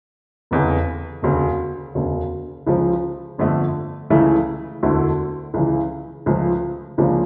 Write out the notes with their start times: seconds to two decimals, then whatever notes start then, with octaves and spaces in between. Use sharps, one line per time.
0.51 F1 E2 C#3
1.22 E1 D2 C#3
1.95 E1 D2 C#3
2.67 C#2 C#3 F3
3.38 G1 F2 D3 A3
4.10 C#2 C#3 E3 A3 E4
4.83 E1 D2 D3 A3 E4
5.54 C#2 C#3 E3
6.26 C#2 C#3 F3 A3
6.98 C#2 C#3 F3 A#3 D4